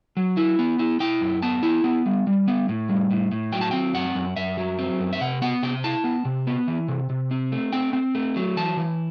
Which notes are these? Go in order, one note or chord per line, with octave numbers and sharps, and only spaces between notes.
F#3
E4
B3
E4
E4 G5
F#2
B3 A5
E4
B3
G3
G3
B3
A2
G3
A2
A2
F#3 G5
A5
C4 G5
F#2 F#5
F#2
F#2 E5
F#3
C4
F#2
E5
C3 F#5
B3 F#5
C3 G5
E4 A5
B3
C3
B3
E3
C3
C3
C4
A3
C4 G5
C4
A3
F#3
E3 A5
E3